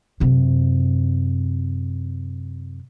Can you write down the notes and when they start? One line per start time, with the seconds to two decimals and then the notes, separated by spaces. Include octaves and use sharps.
0.20 F#2 C3